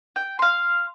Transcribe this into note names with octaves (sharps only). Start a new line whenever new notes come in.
G5
F5 C6